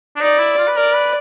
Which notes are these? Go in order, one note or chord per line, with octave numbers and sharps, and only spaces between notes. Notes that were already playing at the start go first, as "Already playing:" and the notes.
D4
D#4 D5
E4
F4
B4
A#4 D5
B4